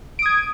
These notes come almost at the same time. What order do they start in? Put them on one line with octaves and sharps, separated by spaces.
D7 D#6 G#6